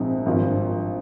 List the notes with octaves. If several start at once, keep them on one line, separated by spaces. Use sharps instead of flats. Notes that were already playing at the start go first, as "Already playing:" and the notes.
Already playing: A#1 G#2 F3 C4
G#1 G2 F3